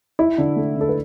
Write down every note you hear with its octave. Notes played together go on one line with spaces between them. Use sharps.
E4
D3
A3
D3 A4
B4